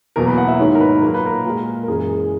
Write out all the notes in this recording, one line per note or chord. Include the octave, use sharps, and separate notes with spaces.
E2 B2 F#3 A#3 A#4
B4
F#5
E5
G#2 D#3 G#3 C#5
A#4
B4
A#2 F#3 A#3 A#4
B4
A#4
A#2 G#3
A#4
F#2 E3 G#3 G#4
G#4